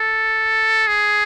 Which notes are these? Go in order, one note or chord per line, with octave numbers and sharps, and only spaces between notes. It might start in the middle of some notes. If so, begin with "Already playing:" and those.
Already playing: A4
G#4